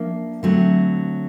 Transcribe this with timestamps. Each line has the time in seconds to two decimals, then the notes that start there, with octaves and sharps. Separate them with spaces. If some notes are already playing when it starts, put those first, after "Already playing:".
Already playing: F3 A#3 D4 E5
0.43 D3 F#3 A3 C4